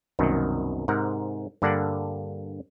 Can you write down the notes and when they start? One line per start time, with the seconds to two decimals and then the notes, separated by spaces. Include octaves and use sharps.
0.19 C2 F#2 B2 D#3
0.88 G#2 C3 G#3 A#4 F#5
1.62 G2 D3 A#3 D4 D5 F#5